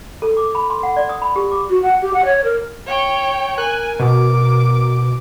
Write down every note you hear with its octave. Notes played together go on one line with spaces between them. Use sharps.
A4
D6
B5
C6
F#5
D5
D#6
B5
G4
D6
F#4
F#5
G4
F#5
C#5
A#4
C#5 G5
A#4 G#5 F#6
B2 D6